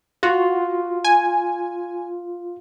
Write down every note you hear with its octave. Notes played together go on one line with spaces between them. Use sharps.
F4 F#4
G#5